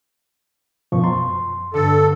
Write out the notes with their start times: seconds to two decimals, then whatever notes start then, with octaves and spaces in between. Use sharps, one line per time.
0.92 F#2 B2 F3 C#6
1.04 F#2 C6
1.74 G2 D3 A4